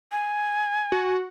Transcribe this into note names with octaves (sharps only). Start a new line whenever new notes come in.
G#5
F#4